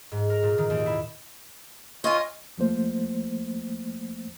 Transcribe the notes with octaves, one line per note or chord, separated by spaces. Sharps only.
G#2
A#4
A#2
D#3
D#2
E4
F4 C#5 D#5 G#5
D#2 F3 A3 A#3 C5